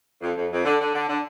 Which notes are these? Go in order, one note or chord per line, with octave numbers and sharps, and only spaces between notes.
F2
F2
F2
D3
D3
D3
D3